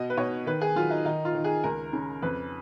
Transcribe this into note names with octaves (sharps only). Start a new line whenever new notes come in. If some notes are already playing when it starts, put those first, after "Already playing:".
Already playing: B2 D#5
B4
B2 C#5
D#3 B4
G#4
F#3 F4
D#4
D#3 D#4
F4
D#3
G#4
C#2 A#4
C#3
F2 B4